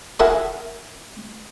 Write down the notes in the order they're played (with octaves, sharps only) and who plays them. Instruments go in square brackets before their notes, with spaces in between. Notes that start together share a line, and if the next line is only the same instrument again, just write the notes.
[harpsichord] E4 G#4 A#4 F#5 B5 C#6